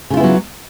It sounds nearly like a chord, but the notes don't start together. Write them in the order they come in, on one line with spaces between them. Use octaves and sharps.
C#3 F4 E4 B3 F#3